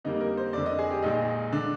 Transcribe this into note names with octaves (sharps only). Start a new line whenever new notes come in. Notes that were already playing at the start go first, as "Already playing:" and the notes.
F2 D3 G3 A#3 D#4
A#4
C5
F1 F2 D3 D5
D#5
G#4
G4
A#1 A#2 G#3 D#4
D3 D4